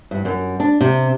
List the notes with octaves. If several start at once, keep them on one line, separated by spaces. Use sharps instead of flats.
G2
F#2
D4
C3